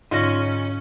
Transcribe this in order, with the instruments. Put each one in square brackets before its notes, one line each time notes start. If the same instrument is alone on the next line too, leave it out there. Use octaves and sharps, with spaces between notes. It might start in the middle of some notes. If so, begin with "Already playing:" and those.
[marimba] G#2 D3 A#6 [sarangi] C#4 [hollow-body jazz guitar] D#4 F4